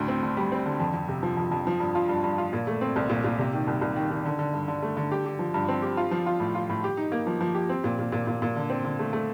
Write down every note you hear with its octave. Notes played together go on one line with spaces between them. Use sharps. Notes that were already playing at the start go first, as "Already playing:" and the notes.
Already playing: D2 A2
C4
D3
G3
C4
D3
F2
F2
C3
F3
F2
F2
F3
G2
F4
G2
G2
F4
A#2
A3
C4
C2
A#2
A#2
C3
D#3
C2
C2
D#3
D#3
D3
D3
G2
D3
A3
D3
G4
G4
F3
G2
C4
G4
F4
F3
F4
A2
F4
A2
G4
D#4
A#3
F3
F3
G4
C4
A#2
A#2
A#2
A#2
A#2
D3
C4
D3
A3
A3